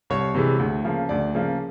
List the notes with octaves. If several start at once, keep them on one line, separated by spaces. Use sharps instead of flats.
C2 C#5
C3 E3 G#3
D2
C#3 F3 A#3
D2 D5
C#3 F3 A#3